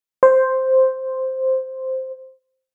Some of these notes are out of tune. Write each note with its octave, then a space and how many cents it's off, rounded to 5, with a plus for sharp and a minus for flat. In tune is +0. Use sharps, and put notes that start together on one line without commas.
C5 +0